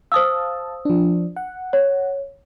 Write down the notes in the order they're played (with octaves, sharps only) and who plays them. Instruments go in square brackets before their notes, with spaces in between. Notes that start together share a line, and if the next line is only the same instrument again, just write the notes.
[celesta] C5 D#6 E6 [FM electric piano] F5 A5
[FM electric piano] F3 D4
F#5
[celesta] C#5